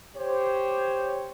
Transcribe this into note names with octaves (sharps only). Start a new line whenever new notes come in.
G4 C5 C#5